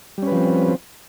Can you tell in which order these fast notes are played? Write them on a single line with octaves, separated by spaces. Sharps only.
G3 C#4 B4 F3 C4